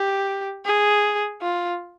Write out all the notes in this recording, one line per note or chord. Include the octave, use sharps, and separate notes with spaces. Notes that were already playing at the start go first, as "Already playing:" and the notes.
Already playing: G4
G#4
F4